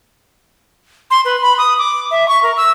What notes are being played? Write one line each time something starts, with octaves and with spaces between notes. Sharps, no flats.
C6
B4
B5
D#6
D6
E5
C#6
A#4
E6